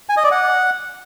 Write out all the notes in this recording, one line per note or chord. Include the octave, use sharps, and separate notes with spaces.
G#5
D#5
D5
F#5